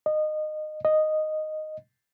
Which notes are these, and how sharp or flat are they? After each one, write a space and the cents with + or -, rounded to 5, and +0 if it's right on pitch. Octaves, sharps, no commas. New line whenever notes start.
D#5 -20
D#5 -5